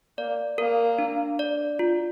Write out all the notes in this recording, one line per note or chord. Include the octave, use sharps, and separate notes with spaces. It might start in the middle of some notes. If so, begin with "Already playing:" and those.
A#3 D5
A#3 A#4
D4
D5
F4